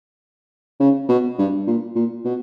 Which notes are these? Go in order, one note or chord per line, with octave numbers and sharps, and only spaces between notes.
C#3
B2
G2
A#2
A#2
B2